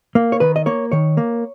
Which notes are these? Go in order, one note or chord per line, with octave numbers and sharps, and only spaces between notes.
A#3
C#5
D#3 B4
D#5
A#3 C#5
D#3 C#5
A#3